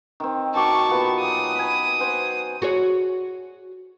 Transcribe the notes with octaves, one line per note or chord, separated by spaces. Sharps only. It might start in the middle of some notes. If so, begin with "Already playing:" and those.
D#3 C4
D#3 F#4 A5 C#6 D6
A#2 B3 G4
F#3 G#5 D#6
G#5 B5
C5 F#5 G#5
F#4 G#4 C#5